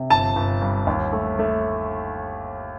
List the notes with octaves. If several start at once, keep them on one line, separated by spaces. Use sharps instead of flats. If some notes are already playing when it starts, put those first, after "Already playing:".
Already playing: C3
G1 A5
G1
G2
D#2
A3
A3